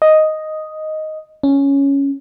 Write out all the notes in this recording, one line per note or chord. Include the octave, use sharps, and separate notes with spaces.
D#5
C#4